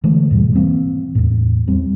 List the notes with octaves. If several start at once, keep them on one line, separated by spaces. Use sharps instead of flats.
D3 E3 G#3 A3
E2 G#2 B2 G3
E3 A#3 C4
E2 A2
E2 G3 C4